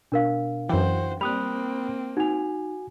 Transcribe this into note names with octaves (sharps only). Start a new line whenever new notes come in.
B2 D4 A#4 F5
F#2 E3 F#4 C5 G5
G3 A#3 C4 B5 D#6 F#6 F7
D#4 F#4 G#5 F7